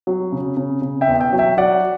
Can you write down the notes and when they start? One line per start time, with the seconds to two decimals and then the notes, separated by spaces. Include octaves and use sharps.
0.07 F#3
0.32 C#3
0.57 C#3
0.82 C#3
1.01 E5 G5
1.07 E2
1.20 E5 G5
1.33 F#3
1.39 E5 G5
1.57 F#3 D5 F#5